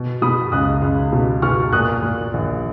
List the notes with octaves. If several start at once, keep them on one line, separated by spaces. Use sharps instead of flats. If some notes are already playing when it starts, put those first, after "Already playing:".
Already playing: B2
B2 B5 D#6
C#2 D#6 F#6
C#2
B2
B2 C#6 F6
A#2 D#6 F#6
A#2
A#1